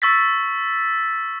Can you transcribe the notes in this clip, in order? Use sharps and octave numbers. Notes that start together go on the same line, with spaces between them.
C#6 E6 A6 B6